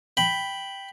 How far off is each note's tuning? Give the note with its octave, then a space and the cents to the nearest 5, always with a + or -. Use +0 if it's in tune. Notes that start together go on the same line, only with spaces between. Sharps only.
G5 +0 B5 +0